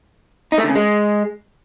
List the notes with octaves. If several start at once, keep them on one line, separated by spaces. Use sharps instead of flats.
D#4
A3
D3
C#3
G#3